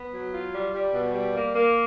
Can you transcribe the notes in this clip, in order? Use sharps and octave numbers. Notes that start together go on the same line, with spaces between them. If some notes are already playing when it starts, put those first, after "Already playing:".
Already playing: B3
F#3
F4
G3
G3
B2
G3
A#3
A#3